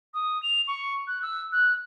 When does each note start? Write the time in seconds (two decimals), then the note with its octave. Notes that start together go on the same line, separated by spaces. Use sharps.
0.14 D#6
0.43 F7
0.68 C#6
1.07 F#6
1.22 E6
1.52 F#6